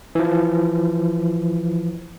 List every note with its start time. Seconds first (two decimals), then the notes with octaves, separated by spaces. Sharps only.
0.15 E3 F3